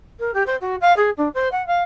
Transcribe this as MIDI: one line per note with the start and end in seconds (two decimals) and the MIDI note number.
0.19 0.31 70
0.34 0.43 67
0.46 0.56 72
0.61 0.76 66
0.81 0.95 77
0.97 1.10 68
1.17 1.28 62
1.34 1.48 72
1.52 1.65 78
1.67 1.83 77